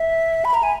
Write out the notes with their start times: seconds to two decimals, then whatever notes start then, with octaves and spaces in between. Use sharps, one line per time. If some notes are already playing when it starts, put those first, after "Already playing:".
Already playing: E5
0.45 B5
0.54 A#5
0.63 G#5